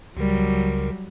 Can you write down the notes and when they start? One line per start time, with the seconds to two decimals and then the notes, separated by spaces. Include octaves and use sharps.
0.17 C#2 C#3 F#3 G3 A#4